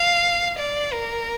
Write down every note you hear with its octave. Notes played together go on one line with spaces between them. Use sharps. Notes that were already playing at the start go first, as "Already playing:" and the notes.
Already playing: F5
D5
A#4